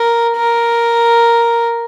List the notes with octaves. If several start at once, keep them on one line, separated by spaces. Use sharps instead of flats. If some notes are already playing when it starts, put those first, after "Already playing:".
Already playing: A#4
A#4